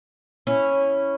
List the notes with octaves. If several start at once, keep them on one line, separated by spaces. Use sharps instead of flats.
C#4 E4